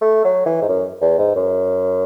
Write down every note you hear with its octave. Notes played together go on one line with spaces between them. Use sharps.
A3
F#3
E3
G#2
F#2
E2
G#2
F#2